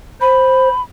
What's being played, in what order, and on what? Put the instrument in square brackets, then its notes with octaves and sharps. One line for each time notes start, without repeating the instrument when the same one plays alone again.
[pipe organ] C5 [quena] B5